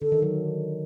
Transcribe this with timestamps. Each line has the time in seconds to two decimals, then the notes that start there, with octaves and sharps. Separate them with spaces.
0.02 D3 A4
0.12 D#3
0.22 F#3